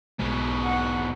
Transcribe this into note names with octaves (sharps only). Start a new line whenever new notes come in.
B1 G#2 B2 G#3
F#5